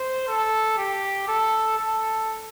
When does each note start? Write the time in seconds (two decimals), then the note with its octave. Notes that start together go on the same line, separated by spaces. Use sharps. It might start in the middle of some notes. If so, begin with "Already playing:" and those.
Already playing: C5
0.28 A4
0.77 G4
1.28 A4
1.78 A4